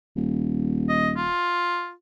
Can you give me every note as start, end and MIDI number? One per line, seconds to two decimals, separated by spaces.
0.16 1.30 27
0.89 1.10 75
1.16 1.92 65